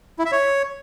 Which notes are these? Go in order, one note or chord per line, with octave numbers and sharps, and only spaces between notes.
E4
E5
C#5